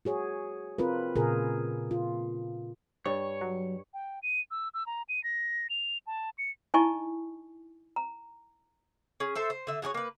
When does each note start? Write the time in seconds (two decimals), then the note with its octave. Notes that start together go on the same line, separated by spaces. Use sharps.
0.05 F#4 G#4 C#5
0.78 C4 F4 A#4 B4
1.16 A#2 C#3 F4 G#4 A#4
1.91 F4
3.06 G2 C#5
3.41 F#3
3.94 G5
4.23 D#7
4.51 E6
4.74 E6
4.86 A#5
5.09 D#7
5.24 A#6
5.70 F7
6.07 A5
6.38 C#7
6.74 D#4 E4 D#5 G#5 A5 C#6
7.96 A#5
9.20 C#4 G#4
9.35 A4 C5 E5
9.50 C5
9.67 D3 E5
9.82 F#4 G#4 A#4 C#5
9.94 A#3 B4